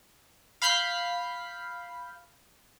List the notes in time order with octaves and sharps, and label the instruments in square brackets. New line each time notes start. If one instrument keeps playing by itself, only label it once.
[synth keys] F5 B5 F6 G6 B6 C7